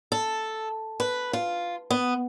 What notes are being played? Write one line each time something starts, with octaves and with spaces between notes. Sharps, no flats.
A4
B4
F4
B3